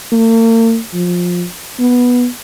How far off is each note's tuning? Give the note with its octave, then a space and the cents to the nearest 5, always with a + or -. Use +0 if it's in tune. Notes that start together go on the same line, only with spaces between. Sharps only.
A#3 -45
F3 +20
B3 -5